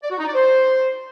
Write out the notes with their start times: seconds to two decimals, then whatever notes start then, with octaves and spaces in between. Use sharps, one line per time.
0.03 D5
0.11 F#4
0.19 D#4
0.27 D5
0.35 C5